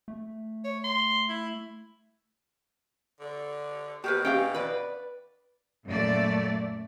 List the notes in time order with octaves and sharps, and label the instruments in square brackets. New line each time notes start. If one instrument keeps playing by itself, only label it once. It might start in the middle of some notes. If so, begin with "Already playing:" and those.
[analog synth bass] A3
[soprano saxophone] C#5
C6
E4
[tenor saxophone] D3
[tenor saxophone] B2 [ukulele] G4 A#4 B4
[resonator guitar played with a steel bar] C#4 [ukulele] G4 F5 G5
[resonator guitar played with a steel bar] B4 D5
[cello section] F#2 A#2 A3 D5